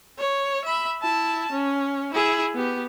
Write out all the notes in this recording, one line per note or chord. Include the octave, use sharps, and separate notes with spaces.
C#5
E5 B5
E4 A5
C#4
E4 G#4
B3 G4